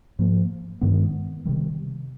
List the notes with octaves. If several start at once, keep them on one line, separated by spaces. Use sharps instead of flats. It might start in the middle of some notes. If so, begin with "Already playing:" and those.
G#2 F3 A#3
G2 D#3 G#3 B3
C3 D#3 G3